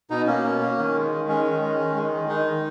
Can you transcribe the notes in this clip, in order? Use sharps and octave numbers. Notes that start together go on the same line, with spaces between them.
B2 D#4
A#3 C#4
B2
A#3
D#3
G#3
D#3
G#3 C#4
D#3
G#3
D#3
G#3
D#3
G#3 D#4
D#3